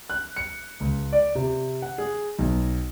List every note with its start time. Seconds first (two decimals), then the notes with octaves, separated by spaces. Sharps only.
0.10 F#6
0.36 C#7
0.80 C#2
1.12 D5
1.35 C3
1.82 F#5
1.98 G#4
2.39 B1